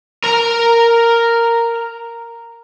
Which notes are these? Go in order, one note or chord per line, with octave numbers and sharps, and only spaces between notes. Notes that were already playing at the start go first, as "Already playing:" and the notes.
A#4 A#5